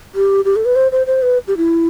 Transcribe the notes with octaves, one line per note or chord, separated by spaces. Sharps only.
G4
G4
A4
B4
C5
C5
C5
B4
G4
E4